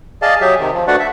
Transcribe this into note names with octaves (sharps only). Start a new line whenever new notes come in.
G#4 D5 D#5 F5 A5
F#3 G4 G#4 E5
C3 D#3
F3
A3 D4 F#4 B4 D5 F#5
E5